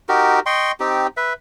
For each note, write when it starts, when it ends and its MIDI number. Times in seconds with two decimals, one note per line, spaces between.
0.09 0.40 63
0.09 0.40 66
0.09 0.40 67
0.09 0.40 70
0.46 0.72 75
0.46 0.72 79
0.46 0.72 84
0.46 0.72 85
0.80 1.07 60
0.80 1.07 63
0.80 1.07 67
1.17 1.33 71
1.17 1.33 76